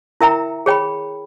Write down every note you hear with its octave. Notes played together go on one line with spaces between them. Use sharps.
E4 A#4 E5 G5 A#5
G#4 C#5 G5 B5